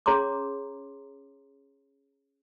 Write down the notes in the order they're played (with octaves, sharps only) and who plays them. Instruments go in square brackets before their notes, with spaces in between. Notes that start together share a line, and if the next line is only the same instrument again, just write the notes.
[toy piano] C#4 G#4 C#5 A#5 C6 D6